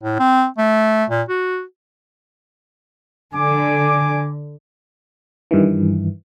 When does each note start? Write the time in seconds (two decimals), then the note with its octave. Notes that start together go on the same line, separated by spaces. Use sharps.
0.03 A2
0.19 C4
0.58 A3
1.10 A#2
1.29 F#4
3.33 D3 G#5 D6
5.51 G2 D#3 E3